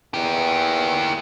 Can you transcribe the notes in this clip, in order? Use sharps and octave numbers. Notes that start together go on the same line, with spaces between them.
E2 A#3 G4